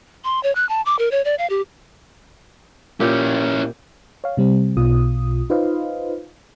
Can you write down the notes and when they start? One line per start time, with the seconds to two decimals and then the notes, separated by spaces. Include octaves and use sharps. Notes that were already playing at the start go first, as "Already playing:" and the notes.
0.24 C6
0.43 C#5
0.55 F#6
0.69 A5
0.86 D6
0.99 A#4
1.11 C#5
1.25 D5
1.38 F5
1.50 G4
3.00 A#2 C#4 E4 G4
4.24 C#5 F5
4.37 C3 G3 C4
4.77 B1 B2 F4 D#6
5.50 D#4 F4 B4 C5 D#5 F5